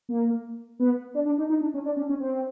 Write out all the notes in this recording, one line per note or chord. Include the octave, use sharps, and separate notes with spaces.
A#3
B3
D4
D4
D#4
D#4
D4
C#4
D4
C#4
C#4
C4